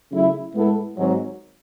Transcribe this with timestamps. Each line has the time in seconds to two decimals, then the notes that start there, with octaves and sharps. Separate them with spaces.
0.12 C#3 F#3 A3 E4
0.55 A2 G#3 B3 E4 A4
0.97 G#1 G#2 F#3